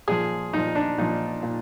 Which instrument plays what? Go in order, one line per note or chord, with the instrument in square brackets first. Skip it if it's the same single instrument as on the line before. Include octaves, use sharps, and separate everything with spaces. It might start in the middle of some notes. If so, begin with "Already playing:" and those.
[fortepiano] A#2 F3 G#4
A#2 F3 D#4
D4
A#2 F3 D#4
A#2